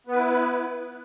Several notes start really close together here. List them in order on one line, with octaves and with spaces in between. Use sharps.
B3 B4 E4